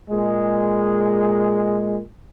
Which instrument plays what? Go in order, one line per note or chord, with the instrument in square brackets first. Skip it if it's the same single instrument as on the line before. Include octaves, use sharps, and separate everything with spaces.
[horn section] A#2 G#3